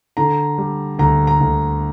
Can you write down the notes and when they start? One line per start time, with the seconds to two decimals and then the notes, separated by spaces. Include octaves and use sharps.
0.17 D3 A#5
0.58 G3
0.99 D2 A#5
1.27 A#5
1.41 D2